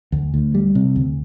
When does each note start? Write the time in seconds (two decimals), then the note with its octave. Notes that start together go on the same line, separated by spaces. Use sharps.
0.12 D2
0.34 D2
0.55 G3
0.75 C3
0.96 D2